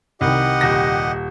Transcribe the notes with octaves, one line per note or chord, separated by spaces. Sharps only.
C2 D#3 G4 D#5 F#5
D#1 A#6